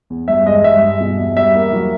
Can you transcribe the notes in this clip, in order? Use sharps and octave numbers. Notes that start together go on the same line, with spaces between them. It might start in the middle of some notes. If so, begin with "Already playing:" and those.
E2
G2 E5
G#3 D#5
G2 E5
G2
B2
E2
G3 E5
A#3
F#3